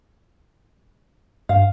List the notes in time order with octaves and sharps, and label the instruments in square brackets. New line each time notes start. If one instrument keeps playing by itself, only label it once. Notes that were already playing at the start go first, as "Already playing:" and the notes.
[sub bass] G2 [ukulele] F5